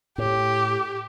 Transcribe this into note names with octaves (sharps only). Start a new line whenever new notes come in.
A2 G4